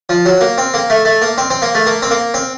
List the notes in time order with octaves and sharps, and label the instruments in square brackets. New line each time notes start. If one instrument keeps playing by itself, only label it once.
[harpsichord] F3
F#3
A#3
C4
A#3
A3
A3
A#3
C4
C4
A#3
A3
A#3
C4
A#3
C4